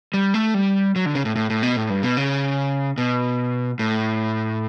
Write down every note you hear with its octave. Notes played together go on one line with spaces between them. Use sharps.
G3
A3
G3
F#3
D3
C#3
A2
A2
A2
B2
A2
G2
B2
C#3
B2
A2